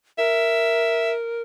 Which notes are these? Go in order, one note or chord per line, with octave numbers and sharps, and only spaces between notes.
A#4 E5